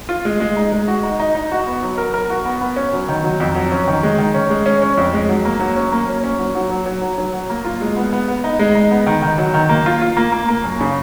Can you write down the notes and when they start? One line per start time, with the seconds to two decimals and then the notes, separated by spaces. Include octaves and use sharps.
0.09 F4
0.25 G#3
0.40 G#3
0.56 D#4
0.72 G#3
0.88 F#4
1.03 D#4
1.20 D#4
1.35 D#4
1.52 F#4
1.67 B3
1.83 F#3
1.98 A#4
2.14 A#4
2.30 F#4
2.45 B3
2.61 B3
2.76 C#4
2.93 F#3
3.09 D#3
3.24 F#3
3.40 F2
3.55 F#3
3.72 C#4
3.88 D#3
4.03 G#3
4.19 D#3
4.34 C#4
4.50 G#3
4.66 C#4
4.82 C#4
4.97 F2
5.14 G#3
5.29 F#3
5.45 A#3
5.60 F#3
5.76 C#4
5.92 A#3
6.08 C#4
6.24 C#4
6.39 F#3
6.55 F#3
6.70 F#3
6.86 F#3
7.02 F#3
7.18 F#3
7.34 F#3
7.50 A#3
7.65 F4
7.81 G#3
7.97 B3
8.13 B3
8.28 B3
8.44 D#4
8.59 G#3
8.75 D#4
8.91 B3
9.06 D#3
9.22 D#3
9.38 F#3
9.54 D#3
9.69 A#3
9.86 F4
10.01 F4
10.17 A#3
10.32 A#3
10.49 A#3
10.64 F#2
10.81 C#3